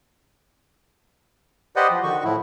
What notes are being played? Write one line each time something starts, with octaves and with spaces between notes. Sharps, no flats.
G4 B4 C5 D5 D#5 F#5
F3
D3 D#3 F#4 C#6
A2 F3 E4